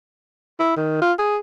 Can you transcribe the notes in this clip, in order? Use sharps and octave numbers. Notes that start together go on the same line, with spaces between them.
E4
D#3
F4
G#4